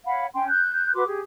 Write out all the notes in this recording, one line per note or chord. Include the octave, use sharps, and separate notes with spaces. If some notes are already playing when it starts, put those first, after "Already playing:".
C#5 F5 F#5 B5
C#4 G5 G#5 C6
F#6 G6
F#4 B4 C6 D6
G4 G#4